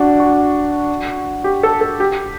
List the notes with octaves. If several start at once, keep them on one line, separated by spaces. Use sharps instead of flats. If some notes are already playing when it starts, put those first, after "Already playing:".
Already playing: D4 F#4
F#4
G4
A4
A4
G4